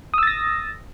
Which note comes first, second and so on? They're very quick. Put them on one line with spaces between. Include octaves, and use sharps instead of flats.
D#6 E6 A6 A#6